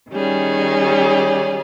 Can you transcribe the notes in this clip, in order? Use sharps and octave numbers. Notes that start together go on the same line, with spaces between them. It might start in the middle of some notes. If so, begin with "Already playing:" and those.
D#3 G3 C#4 G#4